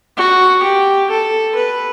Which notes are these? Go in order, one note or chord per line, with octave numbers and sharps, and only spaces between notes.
F#4
G4
A4
B4